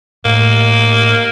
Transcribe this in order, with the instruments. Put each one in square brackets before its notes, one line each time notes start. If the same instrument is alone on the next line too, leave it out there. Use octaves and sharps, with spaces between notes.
[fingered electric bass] A2 [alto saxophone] A#3